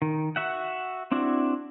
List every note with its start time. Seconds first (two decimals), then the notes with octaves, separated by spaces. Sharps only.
0.02 D#3
0.36 F#4 E5 F#5
1.12 C4 D4 E4 F#4